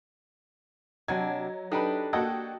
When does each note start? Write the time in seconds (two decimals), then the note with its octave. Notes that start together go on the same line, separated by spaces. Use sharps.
1.08 C3 F#3 D4 D#5 F#5 G#6
1.72 D4 D#4 G4 A4 B4
2.13 A#3 F#4 A4 D#5 F#5 G5 G#6